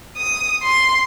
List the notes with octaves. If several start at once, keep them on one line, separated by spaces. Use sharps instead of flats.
D#6
C6